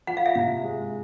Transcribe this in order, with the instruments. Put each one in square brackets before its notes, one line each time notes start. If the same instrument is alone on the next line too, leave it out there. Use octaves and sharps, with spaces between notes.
[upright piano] F3 [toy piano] F#5
[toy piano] F5
E5
[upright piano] C3 [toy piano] F5
[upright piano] G#3